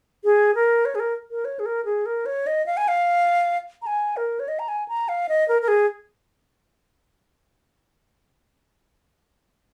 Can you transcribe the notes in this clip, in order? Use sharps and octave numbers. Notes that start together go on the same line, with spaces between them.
G#4
A#4
C#5
G#4
A#4
A#4
C#5
G#4
A#4
G#4
A#4
C#5
D#5
F5
G#5
F5
A#5
G#5
A#4
C#5
D#5
A#5
G#5
A#5
F5
D#5
A#4
A#4
G#4